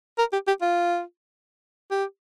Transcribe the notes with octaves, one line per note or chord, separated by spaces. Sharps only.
A#4
G4
G4
F4
G4